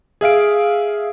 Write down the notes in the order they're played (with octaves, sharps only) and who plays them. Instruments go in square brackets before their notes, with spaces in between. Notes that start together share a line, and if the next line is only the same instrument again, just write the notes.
[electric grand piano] G#4 E5 F5 D7